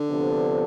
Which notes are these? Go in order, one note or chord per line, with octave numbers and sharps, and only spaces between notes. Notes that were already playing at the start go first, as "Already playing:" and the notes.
Already playing: D3
C3 F3 B3 D4 A4